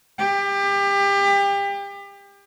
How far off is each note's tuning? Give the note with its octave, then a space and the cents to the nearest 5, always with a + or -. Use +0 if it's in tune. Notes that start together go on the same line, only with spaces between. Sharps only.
G4 +30